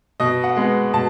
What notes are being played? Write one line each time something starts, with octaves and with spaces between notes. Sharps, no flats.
B2 D#5
F#5
G#3 B3
B2 A5